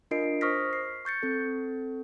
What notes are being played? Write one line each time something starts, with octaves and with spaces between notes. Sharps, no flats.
D4 F4 A#4 D#5 C7 D7
C5 C#6 D#6 F6 A#6 B6
C7
C#6 G6 A6 C#7
C4 A4